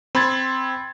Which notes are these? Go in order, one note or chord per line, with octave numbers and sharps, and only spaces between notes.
C4 B5 C6 G#6 A6